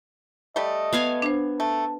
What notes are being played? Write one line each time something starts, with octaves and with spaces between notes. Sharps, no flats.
G3 A3 D#5
B3 F5 G#5
D4 C5
A3 A5